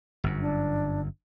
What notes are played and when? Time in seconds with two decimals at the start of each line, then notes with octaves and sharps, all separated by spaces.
0.24 G1 F#2
0.41 D4